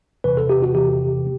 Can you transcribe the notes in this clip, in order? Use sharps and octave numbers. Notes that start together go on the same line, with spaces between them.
E2 C3 E3 B4
A4
G4
F#4
E2 C3 E3 G4